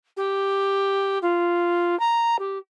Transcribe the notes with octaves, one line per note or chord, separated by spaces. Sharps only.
G4
F4
A#5
G4